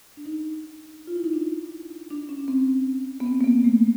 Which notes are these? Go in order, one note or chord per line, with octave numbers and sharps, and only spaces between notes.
D4
D#4
D4
F4
E4
D#4
D4
D4
C#4
C4
B3
C4
A#3
B3
A3